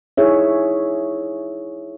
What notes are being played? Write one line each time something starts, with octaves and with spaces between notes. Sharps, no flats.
D#4 E4 G#4 C#5 E5